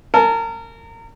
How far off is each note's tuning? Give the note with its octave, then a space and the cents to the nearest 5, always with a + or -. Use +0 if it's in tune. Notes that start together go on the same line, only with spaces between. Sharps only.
A#4 -30 A5 -40